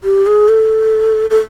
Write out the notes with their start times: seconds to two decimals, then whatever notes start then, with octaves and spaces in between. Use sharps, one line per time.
0.04 G4
0.27 G#4
0.49 A4
1.30 A4